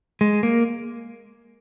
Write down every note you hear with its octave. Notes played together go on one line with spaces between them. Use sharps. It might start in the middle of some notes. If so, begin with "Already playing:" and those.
G#3
A#3